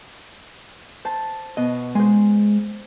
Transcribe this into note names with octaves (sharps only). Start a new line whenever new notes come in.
C5 A5
B2 D#5
G#3 C5 G#5